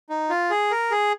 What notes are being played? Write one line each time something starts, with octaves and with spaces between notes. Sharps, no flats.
D#4
F4
G#4
A#4
G#4